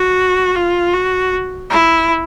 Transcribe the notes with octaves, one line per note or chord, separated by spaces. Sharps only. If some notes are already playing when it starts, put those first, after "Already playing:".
Already playing: F#4
F4
F#4
E4